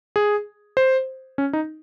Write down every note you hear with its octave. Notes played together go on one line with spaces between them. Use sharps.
G#4
C5
C#4
D#4